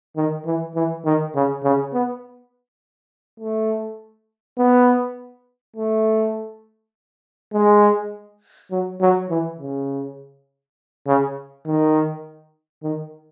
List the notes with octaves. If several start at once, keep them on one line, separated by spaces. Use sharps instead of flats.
D#3
E3
E3
D#3
C#3
C#3
B3
A3
B3
A3
G#3
F#3
F#3
E3
C#3
C#3
D#3
D#3